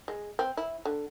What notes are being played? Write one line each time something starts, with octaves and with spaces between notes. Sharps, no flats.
G#3
C4
E4
D3